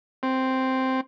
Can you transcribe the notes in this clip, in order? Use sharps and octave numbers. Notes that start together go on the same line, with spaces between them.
C4